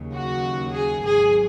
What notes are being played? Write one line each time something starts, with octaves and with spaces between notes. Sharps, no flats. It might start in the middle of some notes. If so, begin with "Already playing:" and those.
Already playing: D#2 C#3 F#3
F#4
G#4
G#1 G#2 F#3 G#4